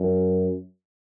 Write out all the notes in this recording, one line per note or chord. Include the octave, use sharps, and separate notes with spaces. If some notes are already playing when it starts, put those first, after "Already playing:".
Already playing: F#2